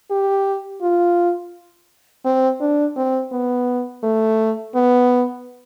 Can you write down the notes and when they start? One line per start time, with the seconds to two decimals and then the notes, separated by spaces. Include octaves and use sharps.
0.10 G4
0.82 F4
2.25 C4
2.60 D4
2.96 C4
3.32 B3
4.03 A3
4.75 B3